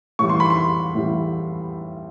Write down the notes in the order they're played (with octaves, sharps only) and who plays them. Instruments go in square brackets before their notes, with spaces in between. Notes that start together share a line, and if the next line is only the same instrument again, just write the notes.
[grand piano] A2 E3 G3 C#6
C6
B5
C6
A2 E3 G3